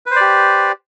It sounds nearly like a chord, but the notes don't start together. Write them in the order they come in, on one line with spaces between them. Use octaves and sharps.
B4 C5 D5 G4